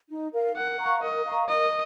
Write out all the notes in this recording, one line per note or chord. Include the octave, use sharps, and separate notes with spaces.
D#4
A#4 F5
A#4 F#5
F5 A#5 C#6
A#4 D#5
F5 A#5 C#6
A#4 D#5